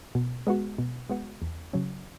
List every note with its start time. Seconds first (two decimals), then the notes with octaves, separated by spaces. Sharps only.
0.15 B2
0.47 G#3 B3 F#4
0.78 B2
1.09 G#3 B3 F#4
1.42 E2
1.73 C#3 F#3 C#4